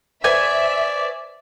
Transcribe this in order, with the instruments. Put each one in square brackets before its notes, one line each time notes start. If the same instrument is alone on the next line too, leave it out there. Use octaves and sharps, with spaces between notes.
[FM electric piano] B4 C5 [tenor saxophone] D5 [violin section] E5 [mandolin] G#5